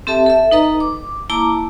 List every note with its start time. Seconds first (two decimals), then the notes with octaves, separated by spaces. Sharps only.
0.07 C4 G4 A4 E5 A5
0.26 A4 E5
0.51 D#4 A4 B4 D#5 A#5
0.80 D6
1.30 A#3 E4 A5 A#5 D6